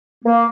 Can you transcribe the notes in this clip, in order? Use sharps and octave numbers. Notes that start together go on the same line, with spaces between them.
A#3